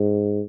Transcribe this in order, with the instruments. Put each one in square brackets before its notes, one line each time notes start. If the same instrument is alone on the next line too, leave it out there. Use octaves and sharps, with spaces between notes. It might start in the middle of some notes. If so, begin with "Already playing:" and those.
Already playing: [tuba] G#2